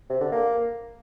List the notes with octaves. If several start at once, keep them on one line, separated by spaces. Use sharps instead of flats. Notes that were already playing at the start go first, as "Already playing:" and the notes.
C3
D3
A#3